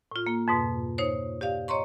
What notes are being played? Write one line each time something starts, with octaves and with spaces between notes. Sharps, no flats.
A2 F4
A#3
F2 G#2 B2
D#4 C5 C#5
G4 D5 F5
C#5 D#5 A#5 C6 C#6